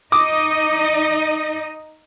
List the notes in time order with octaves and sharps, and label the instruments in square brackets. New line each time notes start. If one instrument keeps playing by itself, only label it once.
[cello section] D#4 D#5 [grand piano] D6 D#6